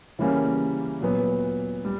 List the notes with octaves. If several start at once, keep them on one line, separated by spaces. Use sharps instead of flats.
C#3 E3 G3 A#3 C#4
A#2 F#3 B3
G3